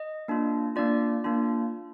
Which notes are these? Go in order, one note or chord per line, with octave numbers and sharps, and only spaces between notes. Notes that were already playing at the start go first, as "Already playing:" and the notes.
Already playing: D#5
A#3 D4 F4
A#3 D4 F4 D5
A#3 D4 F4